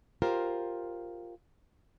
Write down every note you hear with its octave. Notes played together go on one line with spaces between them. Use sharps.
F4 G4 A#4 C5